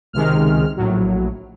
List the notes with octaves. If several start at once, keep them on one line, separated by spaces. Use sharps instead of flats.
C#2 C3 D#3 G#3 F6
A#1 A2 F#3